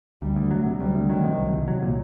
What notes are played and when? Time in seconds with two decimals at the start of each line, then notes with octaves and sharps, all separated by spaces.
0.22 D2 G3
0.36 D2
0.51 F#3
0.66 C3
0.80 D2 G3
0.95 D2
1.09 D#3 F#3
1.24 C3
1.38 C2
1.53 C2
1.68 F#3
1.83 A#2